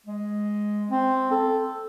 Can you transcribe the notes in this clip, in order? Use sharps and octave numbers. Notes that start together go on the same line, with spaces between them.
G#3
C4
A4